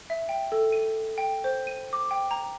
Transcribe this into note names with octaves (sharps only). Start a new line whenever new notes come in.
E5
G5
A4
D#7
G5
C5
D#7
D6
G5
A#5